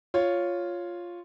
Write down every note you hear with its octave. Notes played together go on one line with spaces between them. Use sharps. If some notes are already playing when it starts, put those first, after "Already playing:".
F4 C#5